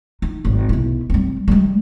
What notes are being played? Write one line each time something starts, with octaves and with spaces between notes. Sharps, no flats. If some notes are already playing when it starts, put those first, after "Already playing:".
D#4
G#1
B1 E4
G3 C4
G3 G#3